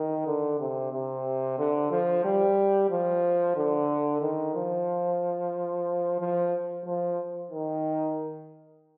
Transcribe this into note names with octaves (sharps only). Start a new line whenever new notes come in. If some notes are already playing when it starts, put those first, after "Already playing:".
Already playing: D#3
D3
C3
C3
D3
F3
G3
F3
D3
D#3
F3
F3
F3
D#3